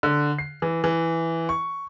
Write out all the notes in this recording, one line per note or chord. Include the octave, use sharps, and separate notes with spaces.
D3
C7
E3
E3
C#6